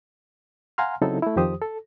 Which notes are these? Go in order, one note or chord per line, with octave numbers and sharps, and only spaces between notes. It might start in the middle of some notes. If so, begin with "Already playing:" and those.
F5 F#5 G#5 A#5 C6 F6
C#3 F#3 C4 D#4 E4 A4
A3 E4
F2 D#3 F3 G4 C5 D#6
A4